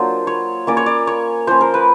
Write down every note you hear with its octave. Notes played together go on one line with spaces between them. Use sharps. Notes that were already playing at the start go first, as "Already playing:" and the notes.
Already playing: F#3 A#3 D4 F4 C5
C#5
A#3 C#4 F4 D5
C#5
D5
C#5
F3 A#3 C#4 C5
A#4
B4